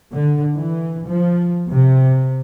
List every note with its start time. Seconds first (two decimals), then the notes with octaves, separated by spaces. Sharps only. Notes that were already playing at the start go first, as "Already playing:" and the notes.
0.13 D3
0.58 E3
1.07 F3
1.69 C3